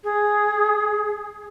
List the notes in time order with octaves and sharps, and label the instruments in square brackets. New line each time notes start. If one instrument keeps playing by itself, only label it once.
[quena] G#4